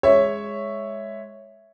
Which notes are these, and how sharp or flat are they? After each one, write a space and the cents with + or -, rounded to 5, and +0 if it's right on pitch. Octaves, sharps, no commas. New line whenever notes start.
G#3 -5 C#5 +0 E5 +0